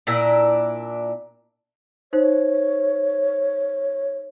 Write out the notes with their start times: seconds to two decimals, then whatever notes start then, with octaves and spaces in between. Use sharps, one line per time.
0.07 A#2 D4 E4 A#4
2.13 D#4 C5 C#5